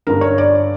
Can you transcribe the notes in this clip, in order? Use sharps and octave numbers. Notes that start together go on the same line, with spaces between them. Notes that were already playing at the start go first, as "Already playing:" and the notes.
G2 D3 A#4
C#5
D5